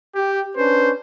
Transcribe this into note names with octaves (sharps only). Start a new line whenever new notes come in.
G4
C#4 D4 B4 C5